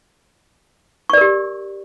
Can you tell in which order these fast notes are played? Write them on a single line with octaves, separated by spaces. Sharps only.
C#6 D5 A#4 G4